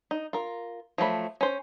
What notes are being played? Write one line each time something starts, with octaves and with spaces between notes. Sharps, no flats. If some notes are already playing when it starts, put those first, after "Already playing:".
D#4
F4 A#4
F3 F#3 A3 B5
C#4 C5